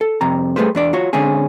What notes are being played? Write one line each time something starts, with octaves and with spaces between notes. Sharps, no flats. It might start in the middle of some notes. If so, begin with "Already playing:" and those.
A4
C2 F2 C3 A#5
G3 A3 C#4 G#4 B4 C5
E2 D4 D5
F4 F#4 C#5
D3 G#3 C4 C#4 G#4